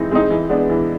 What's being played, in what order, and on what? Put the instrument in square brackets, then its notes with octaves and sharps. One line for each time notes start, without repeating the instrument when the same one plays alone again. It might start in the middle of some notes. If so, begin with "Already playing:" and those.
Already playing: [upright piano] E3 G#3 C4 D#4
G#3 C4 D#4
E3
G#3 B3 D4
E3